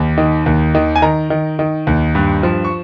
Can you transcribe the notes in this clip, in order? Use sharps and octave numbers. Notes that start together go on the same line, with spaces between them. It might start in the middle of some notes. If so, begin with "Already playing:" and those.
Already playing: D#2
D#3
D#2
D#3
G#5
D#3 A#5
D#3
D#3
D#2
G2
F3
C#6